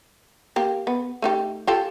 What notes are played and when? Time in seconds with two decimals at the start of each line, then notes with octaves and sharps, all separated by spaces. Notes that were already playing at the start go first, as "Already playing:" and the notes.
0.56 A#3 G4
0.87 B3
1.22 A3 D#4 G4
1.67 F4 G4 A4